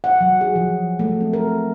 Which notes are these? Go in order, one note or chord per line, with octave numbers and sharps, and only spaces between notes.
F#5
F#3
G#4
F3
A3
C4
A#4